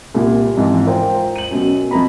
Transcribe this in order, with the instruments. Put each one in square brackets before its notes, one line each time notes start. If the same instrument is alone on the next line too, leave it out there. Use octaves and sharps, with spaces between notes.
[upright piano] C2 A#2
F2 G#2 E3
F4 A#4 C5 G5
D#7 F#7
F#2 B2
F2 B4 A#5 B5